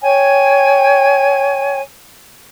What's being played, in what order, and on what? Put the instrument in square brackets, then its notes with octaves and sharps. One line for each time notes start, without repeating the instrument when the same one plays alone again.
[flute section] C#5 G5 G#5